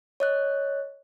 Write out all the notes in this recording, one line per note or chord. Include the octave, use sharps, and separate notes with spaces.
C#5 D#5 F#6